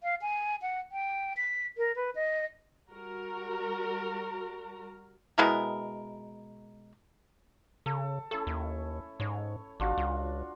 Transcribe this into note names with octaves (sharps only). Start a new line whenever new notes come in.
F5
G#5
F#5
G5
B6
A#4
B4
D#5
G3 F#4 A#4 A#5
B2 G#3 E4 A#4
C#3 A4
A3 C#4 E4 A4
D#2
G#2 C#5
G#1 D4 F4 F#4
C#2